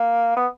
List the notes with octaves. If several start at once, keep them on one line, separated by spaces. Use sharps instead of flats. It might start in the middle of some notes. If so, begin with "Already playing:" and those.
Already playing: A#3
B3